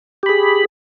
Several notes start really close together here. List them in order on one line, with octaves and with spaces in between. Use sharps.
G4 B5 G#4